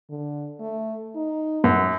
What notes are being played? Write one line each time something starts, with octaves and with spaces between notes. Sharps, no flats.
D3
A3
D#4
F#2